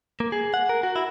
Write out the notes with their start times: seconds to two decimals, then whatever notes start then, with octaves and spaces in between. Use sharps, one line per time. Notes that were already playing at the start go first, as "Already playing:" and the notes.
0.20 A#3
0.32 G#4
0.54 F#5
0.69 A#4
0.83 F#4
0.96 E4